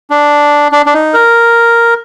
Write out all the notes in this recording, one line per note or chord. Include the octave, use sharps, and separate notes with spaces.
D4
D4
D4
D#4
A#4